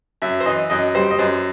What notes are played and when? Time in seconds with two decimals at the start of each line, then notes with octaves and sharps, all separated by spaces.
0.22 F#2 E5
0.41 C5
0.46 E3 D#5
0.70 F#2 D#5
0.95 G3 C5
1.11 D#5
1.19 F#2 C5